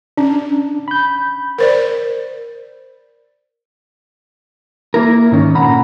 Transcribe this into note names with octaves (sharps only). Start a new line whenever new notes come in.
C#4 D4
B5 G6
A#4 C5 D5
A#3 E4 A#4
G#2 D#3 C#4
A#2 D3 F#5 A#5 B5